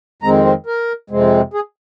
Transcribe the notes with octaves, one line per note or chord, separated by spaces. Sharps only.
F2 D#3 G#3 C4 A#5
C5
A#4
F2 C3 G#3 C4
G#4